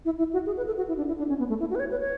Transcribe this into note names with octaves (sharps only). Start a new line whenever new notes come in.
E4
E4
F#4
G#4
B4
A4
F#4
E4
D4
E4
D4
C#4
B3
A3
E4
F#4
B4
C#5
B4
C#5